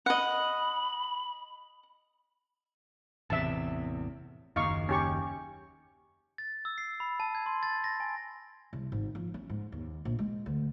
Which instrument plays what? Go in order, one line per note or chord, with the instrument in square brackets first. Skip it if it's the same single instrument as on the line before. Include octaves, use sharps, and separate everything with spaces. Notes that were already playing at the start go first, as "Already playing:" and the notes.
[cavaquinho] D#5 F#5 [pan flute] B5
[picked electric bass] A1 E2 C3 [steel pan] E5 A5
[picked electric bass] F#1 D#2 [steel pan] D#4 F5 C#6
[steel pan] C#4 G4 C#6
[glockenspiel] A6
E6
C7
B5
A5
G#6
C6
A6
A#6
G#5
[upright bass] C2
G#1
F3
C#4
G#2
D#2
A#1
G#3
D2